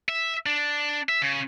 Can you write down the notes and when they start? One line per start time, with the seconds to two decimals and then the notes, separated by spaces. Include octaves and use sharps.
0.09 E5
0.46 D4
1.09 E5
1.22 C#3